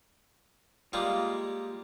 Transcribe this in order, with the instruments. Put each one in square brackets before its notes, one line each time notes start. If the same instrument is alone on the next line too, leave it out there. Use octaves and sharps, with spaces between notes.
[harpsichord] G3 G#3 A#3 [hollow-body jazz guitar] F4